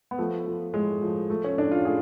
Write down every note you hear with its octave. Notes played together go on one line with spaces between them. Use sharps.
B3
F3 A3
F3
A2 G#3
F3
F3 A3
C#4
A2 D4
F4
A2 G#4